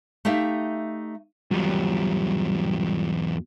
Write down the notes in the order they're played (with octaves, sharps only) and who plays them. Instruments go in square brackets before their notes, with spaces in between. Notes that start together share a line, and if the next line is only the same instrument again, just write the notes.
[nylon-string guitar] A3 D#4 G4 E5 F5
[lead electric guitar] E2 F#3 [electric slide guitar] G3 F4 G4